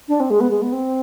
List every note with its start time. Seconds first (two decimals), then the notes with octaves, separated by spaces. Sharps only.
0.08 D4
0.20 C4
0.30 G#3
0.40 B3
0.51 G#3
0.62 B3
0.72 C4